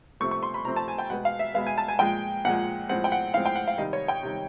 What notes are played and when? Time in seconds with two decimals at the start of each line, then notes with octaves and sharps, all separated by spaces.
0.20 C3 F3 A3 C4 C#6
0.31 C#6
0.43 C6
0.54 B5
0.65 C3 F3 A3 C4 A#5
0.76 A5
0.88 G#5
0.98 G5
1.10 B2 G#3 B3 F#5
1.25 F5
1.39 E5
1.54 B2 G#3 B3 F5
1.67 G#5
1.78 A5
1.88 G#5
1.99 A#2 F3 G#3 G5
2.45 A#2 F3 G#3 F#5
2.89 A2 F3 G#3 C4 F#5
3.04 G5
3.12 F#5
3.34 A2 F3 G#3 C4 F5
3.46 G5
3.56 F#5
3.68 F5
3.78 C3 D#3 G3 D#5
3.93 C#5
4.08 G5
4.23 C3 D#3 G3